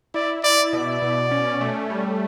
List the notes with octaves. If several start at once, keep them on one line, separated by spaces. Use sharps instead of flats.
E4 D5
E4 D5
B2 D5
B2
C#4
A3
G3